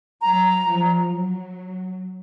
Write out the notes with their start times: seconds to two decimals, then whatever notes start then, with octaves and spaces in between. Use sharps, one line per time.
0.22 F#3 A#5
0.67 F3
1.11 F#3